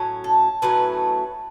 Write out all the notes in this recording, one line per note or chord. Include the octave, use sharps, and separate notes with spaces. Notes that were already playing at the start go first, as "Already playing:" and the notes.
Already playing: A2 F#3 C#4
A4
A2 F#3 A3 C#4 B4